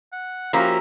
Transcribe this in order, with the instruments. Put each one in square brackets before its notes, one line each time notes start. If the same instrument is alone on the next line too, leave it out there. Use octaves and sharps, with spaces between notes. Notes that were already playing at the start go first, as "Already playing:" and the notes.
[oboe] F#5
[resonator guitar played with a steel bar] F3 A#3 C#4 [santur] F#4 G4 A#5 [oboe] E5